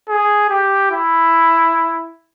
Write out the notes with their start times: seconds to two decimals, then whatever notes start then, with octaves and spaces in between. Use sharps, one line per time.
0.09 G#4
0.50 G4
0.91 E4